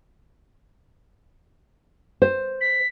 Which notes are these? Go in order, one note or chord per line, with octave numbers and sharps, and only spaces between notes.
C5
B6